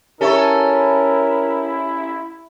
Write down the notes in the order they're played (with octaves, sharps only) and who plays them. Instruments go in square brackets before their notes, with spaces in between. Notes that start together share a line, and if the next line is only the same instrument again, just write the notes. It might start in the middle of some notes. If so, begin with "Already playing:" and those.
[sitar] C#4 A4 [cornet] E4 [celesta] G4 E5 C#6 [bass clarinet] A#4